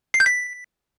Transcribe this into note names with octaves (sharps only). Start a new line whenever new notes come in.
C7
G6
B6